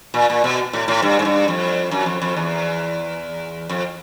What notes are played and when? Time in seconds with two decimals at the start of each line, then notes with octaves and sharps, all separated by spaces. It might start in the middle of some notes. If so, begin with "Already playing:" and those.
0.14 A#2
0.30 A#2
0.44 B2
0.73 A2
0.88 A2
1.02 G2
1.19 G#2
1.25 G2
1.48 F2
1.91 F#2
2.06 F2
2.22 F2
2.37 E2
3.69 F2